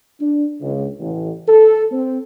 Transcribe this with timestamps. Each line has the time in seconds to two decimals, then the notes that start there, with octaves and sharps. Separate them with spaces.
0.21 D4
0.61 C#2
1.01 A1
1.48 A4
1.92 C4